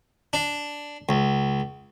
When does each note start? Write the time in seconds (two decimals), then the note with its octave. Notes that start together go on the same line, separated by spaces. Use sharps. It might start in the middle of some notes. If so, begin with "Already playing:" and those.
0.33 D4
1.09 C#2